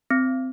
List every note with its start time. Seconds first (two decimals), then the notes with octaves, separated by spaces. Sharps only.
0.11 C4